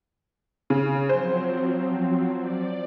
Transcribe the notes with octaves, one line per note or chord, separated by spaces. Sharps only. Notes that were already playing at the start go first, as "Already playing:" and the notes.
C#3
F3 F#3 C4 C5
D5